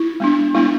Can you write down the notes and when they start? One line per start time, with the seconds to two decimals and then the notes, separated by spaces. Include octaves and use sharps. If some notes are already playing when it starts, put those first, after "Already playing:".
Already playing: E4
0.20 G#3 B3 D4
0.55 G#3 B3 D4 E4